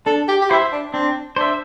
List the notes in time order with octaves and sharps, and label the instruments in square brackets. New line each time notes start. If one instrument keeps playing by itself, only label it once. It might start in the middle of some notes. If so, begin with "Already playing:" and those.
[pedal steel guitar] D4 [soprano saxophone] A4
[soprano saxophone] G4
G4
[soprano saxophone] E4 [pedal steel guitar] C5 E5
[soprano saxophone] D4
[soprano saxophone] C4 [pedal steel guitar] D4
[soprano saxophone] D4 [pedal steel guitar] C5 E5